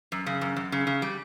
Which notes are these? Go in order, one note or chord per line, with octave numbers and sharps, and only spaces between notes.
F#2
C#3
F#2
F#2
C#3
C#3
G3